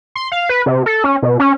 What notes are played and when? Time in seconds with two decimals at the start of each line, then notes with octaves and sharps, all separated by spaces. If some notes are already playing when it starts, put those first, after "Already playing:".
0.15 C6
0.32 F5
0.49 B4
0.66 C3
0.86 A4
1.04 C#4
1.23 B2
1.40 C#4